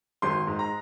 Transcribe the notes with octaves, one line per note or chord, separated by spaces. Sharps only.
G#1 C6
G#2
A#5